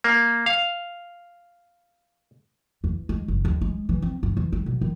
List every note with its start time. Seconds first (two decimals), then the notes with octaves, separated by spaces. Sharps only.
0.04 A#3
0.46 F5
2.84 E2
3.09 G#3
3.28 F#1
3.45 D#2
3.61 G#3
3.89 E3
4.02 C4
4.23 G2
4.37 E2
4.52 G3
4.66 B2
4.81 D#3